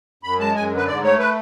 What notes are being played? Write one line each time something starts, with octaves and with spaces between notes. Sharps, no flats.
F#2 B5
G#3 A5
F#2 G#5
D3
B4
G#2 D5
A3 C#5
B4